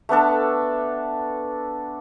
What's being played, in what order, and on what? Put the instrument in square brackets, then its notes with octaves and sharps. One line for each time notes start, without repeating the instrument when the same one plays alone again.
[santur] A3 B3 D4 A4